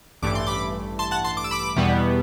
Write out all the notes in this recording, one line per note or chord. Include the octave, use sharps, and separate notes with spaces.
A1 G2 E3 A3 D6
C6
B5 D6
A5 C6
F#5 A5
A5 C6
D6
E6
B5 D6
E2 B2 G3 B3